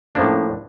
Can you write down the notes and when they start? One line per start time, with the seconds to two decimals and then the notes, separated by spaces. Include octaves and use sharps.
0.15 A2 F3 A#3 C#4 D4